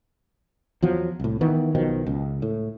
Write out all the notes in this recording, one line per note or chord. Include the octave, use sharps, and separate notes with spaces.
E2 F3 F#3
C2 A2
D#3 E3 B3
B1 B2 D#3 F3
C#2
A2